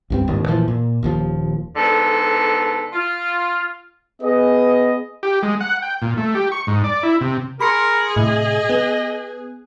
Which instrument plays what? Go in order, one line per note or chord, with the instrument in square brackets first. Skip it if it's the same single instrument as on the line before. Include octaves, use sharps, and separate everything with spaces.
[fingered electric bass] C#2 G2 C4
D1 D#2 G#2
A#2 E3 F3
A#2
D#1 D#2 F3
[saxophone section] G#2 D3 B3 A4
F4
[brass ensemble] B3 G#4 B4 D#5
[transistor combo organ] G4
G#3
F#5
G5
A#2
A3
G4
C#6
G#2
D5
E4
C3
[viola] G#4 [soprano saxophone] A#4 [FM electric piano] B5 C6 C#7
[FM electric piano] A2 C3 [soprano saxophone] D#5
[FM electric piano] B3